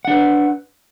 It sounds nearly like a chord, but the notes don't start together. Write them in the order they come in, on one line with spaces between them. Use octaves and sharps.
F#5 D4 B4